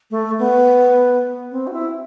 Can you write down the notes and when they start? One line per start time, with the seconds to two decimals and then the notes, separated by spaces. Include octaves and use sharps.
0.11 A3
0.39 B3
1.52 C4
1.67 F#4
1.72 E4